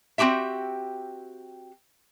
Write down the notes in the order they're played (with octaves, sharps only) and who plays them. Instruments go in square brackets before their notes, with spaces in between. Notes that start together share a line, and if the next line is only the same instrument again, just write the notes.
[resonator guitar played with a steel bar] C4 D#4 F#4 G4 E5